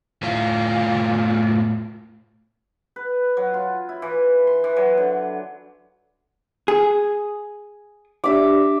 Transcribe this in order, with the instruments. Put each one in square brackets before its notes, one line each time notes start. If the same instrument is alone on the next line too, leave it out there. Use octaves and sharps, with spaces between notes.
[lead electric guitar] A2 F4
[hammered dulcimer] B4
F#3
F4
E4
E3
C6
E3
F#3
D3
[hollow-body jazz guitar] G#4
[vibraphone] D4 G4 D5 [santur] E5 D6